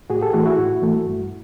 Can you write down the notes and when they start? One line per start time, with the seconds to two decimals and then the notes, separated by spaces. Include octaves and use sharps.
0.10 A2 F#4 G#4
0.21 G4 A4
0.33 E3 A3 F#4 G#4
0.46 E4 F#4
0.59 A2
0.82 E3 A3
1.06 G2